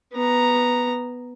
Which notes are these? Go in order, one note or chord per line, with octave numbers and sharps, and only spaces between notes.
B3 A#5